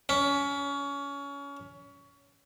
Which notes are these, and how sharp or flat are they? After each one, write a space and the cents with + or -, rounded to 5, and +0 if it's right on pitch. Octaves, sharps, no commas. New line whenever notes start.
C#4 +25